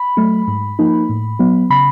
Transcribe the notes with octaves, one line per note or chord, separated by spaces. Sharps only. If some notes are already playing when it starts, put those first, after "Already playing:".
Already playing: B5
F#3 A3
G#2
F3 A#3 D#4
A2
F#3 B3
C#3 B5